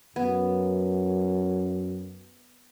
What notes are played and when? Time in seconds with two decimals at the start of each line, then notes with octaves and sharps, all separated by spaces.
0.16 F#2 B3